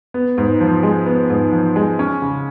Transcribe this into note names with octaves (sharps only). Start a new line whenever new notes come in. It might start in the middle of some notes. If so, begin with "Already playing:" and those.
B3
G#2
F3
G#3
B3
G#2
F3
G#3
C#4
C#3